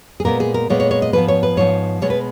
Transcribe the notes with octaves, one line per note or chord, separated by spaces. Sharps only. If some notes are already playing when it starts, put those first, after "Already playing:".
G#4
A#2 G#3 B3 A#4
G#4
A#4
A#2 G#3 B3 C#5
C#5
C#5
D#5
G#2 F3 B3 B4
C#5
B4
G#2 F3 B3 C#5
B2 G#3 B3 C#5
B4